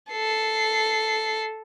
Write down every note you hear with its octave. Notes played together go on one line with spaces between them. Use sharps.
A4 C7